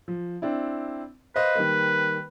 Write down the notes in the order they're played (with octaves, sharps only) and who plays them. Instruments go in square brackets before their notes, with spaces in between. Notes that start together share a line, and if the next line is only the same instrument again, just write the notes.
[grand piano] F3
C4 D4 E4
[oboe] B4 [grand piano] C5 D#5 F5
[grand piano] D#3 G3 A#3